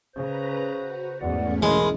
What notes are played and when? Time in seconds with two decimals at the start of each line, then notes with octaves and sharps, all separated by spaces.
0.15 C#3 B4 C5 A#5
0.74 F#4
1.21 E2 G#2 E3 A3 C#4 D5 F#5
1.62 B1 G#3 A#4 B5 C6